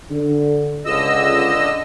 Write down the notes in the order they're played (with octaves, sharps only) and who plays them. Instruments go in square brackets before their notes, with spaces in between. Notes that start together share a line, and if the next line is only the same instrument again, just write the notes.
[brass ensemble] D3
[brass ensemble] C#2 [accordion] D3 D#5 E6